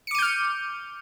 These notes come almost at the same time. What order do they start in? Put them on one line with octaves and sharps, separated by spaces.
C#7 D6 D#7 G6 F6